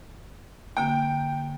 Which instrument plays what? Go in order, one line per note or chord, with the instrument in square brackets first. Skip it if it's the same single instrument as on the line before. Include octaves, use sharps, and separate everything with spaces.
[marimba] D3 A#3 [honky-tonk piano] G5